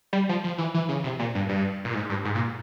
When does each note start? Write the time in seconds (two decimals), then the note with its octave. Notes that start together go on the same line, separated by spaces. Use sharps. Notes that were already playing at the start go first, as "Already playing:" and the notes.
0.13 G3
0.29 F3
0.44 F3
0.58 E3
0.74 E3
0.89 C#3
1.04 C3
1.19 A#2
1.35 G2
1.49 G2
1.85 A#2
1.95 G#2
2.09 G2
2.25 G#2
2.35 A#2